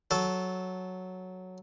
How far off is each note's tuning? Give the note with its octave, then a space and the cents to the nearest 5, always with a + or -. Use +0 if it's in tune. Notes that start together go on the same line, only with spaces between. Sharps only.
F#3 +0 A4 -15